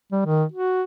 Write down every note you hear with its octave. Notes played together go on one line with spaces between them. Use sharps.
G3
D#3
F#4